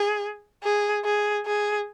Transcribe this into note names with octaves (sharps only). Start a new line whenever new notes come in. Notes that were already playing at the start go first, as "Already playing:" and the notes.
Already playing: G#4
G#4
G#4
G#4